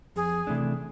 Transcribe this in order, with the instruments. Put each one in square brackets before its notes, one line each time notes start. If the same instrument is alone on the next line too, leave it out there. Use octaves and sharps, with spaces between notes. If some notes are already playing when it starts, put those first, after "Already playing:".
[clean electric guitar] F2 [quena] G#4
[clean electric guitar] C3 E3 A3 D4